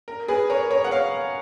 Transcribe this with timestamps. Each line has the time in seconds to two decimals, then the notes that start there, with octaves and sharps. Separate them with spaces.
0.08 A#4
0.28 G#4 B4
0.50 A#4 C#5
0.71 A#4 C#5
0.84 F#5
0.91 C#5 F5